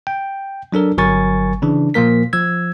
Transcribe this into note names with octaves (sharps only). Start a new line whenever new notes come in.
G5
F#3 D4 A4 A#4
G1 F#3 A#4 G#5 C#6 A6
C#3 E3 D4
A#2 F3 A#3 A#4 B6
F3 E6 G#6